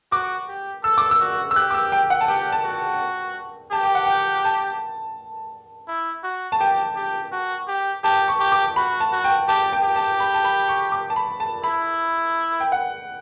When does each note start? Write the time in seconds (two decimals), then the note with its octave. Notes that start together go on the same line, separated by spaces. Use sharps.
0.12 F#4 D6
0.48 G4
0.84 A4 E6
0.98 D6
1.11 E6
1.21 F#4
1.51 E6
1.56 G4 F#6
1.71 D6
1.74 E6
1.92 G5
2.10 F#5
2.21 A5
2.28 G4 G5
2.52 A5
2.64 F#4
3.72 G4 A5
3.83 G5
3.95 F#5
4.06 G5
4.45 A5
5.88 E4
6.24 F#4
6.52 A5
6.60 G4 G5
6.96 G4
7.32 F#4
7.68 G4
8.04 G4 A5
8.28 C#6
8.40 G4
8.52 D6
8.76 F#4 B5
9.00 A5
9.12 F#4
9.24 G5
9.48 G4 A5
9.73 G5
9.84 G4
9.96 A5
10.20 B5
10.34 A5
10.44 B5
10.68 C#6
10.92 D6
11.10 A5
11.16 B5
11.40 A5
11.64 E4 B5
12.60 G5
12.72 F#5